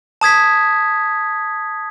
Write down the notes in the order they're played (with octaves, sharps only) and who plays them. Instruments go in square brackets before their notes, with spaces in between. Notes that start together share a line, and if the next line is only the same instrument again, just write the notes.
[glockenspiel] A5 D#6 G#6 B6